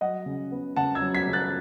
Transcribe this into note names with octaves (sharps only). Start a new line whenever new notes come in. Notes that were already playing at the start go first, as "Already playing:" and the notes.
F#3 D#5 F#5
C#3
B3
C#3 F#5 A5
E6 G#6
F#3
G#6 B6
C#3
F#6 A6